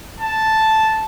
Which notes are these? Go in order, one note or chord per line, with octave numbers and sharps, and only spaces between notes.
A5